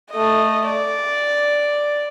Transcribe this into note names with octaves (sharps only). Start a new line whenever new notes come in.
A3 D#5
D5